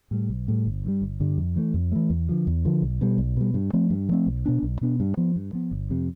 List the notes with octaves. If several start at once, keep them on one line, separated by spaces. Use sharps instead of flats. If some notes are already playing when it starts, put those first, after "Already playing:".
A2 G3
B1
A2 G3
G1
G2 D3 G3
G1
G2 D3 G3
F2
E3 A3
F2
E3 A3
E2
D3 F3
E2
D3 F3
B1
B2 G3
B1
B2 G3
G2
F3 A3 C4
G2
F3 A3 C4
B1
B2 B3 D4
B1
B2 B3 D4
G2
F3 B3
G2
F3 B3
G1
F2 C3